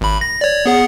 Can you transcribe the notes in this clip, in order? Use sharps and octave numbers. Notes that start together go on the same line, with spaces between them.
G#1 B5
A#6
C#5 D5
B3 G#4 F#5